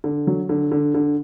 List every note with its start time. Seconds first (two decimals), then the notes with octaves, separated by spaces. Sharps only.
0.04 D3
0.27 F#3
0.49 D3
0.72 D3
0.94 D3